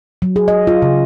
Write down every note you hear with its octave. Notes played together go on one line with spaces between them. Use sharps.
F#3
G#4
D#5
F4
C#3